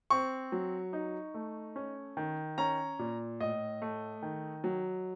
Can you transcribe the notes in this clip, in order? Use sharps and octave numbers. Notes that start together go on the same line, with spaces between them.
C4 C#6
F#3
D#4
A3
C#4
D#3
C#4 A#5
A#2
A2 D#5
A3
D#3
F#3